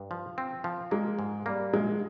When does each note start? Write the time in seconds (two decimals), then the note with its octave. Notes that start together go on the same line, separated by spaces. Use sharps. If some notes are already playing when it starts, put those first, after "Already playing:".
Already playing: G2
0.11 F3
0.38 C4
0.64 F3
0.91 G#3 A#3
1.19 G#2
1.46 G3 A#3
1.73 A#1 G#3